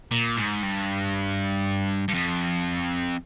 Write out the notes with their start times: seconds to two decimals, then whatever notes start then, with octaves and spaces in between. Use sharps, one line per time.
0.11 A#2
0.37 G#2
0.63 G2
2.08 G2
2.14 F2